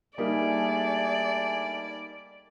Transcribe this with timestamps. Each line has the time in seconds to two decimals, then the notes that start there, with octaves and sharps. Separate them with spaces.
0.18 G3 A3 A#3 D4 D#4 G#4 D5 G#5